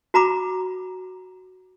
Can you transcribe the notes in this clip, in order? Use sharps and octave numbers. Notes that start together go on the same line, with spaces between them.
F#4 A#5 B5 D6